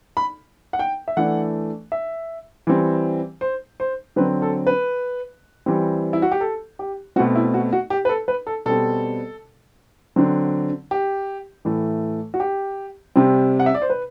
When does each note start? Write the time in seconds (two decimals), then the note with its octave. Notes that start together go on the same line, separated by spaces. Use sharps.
0.17 B5
0.73 F#5
0.79 G5
1.08 E5
1.17 E3 A3 D4 F#5
1.92 E5
2.67 E3 G3 C4
3.41 C5
3.80 C5
4.16 D3 F#3 C4 B4
4.42 A4
4.67 B4
5.66 E3 G3 C4
6.13 E4
6.22 F#4
6.32 G4
6.41 A4
6.79 G4
7.16 B2 A3 C4 F#4
7.35 E4
7.54 F#4
7.73 F#4
7.90 G4
8.05 B4
8.09 A4
8.28 B4
8.47 A4
8.66 B2 G3 C4 A4
10.16 D3 F#3 C4
10.91 G4
11.65 A2 E3 A3
12.34 F#4
12.40 G4
13.16 C3 G3 C4
13.60 F#5
13.66 E5
13.74 D5
13.82 C5
13.90 B4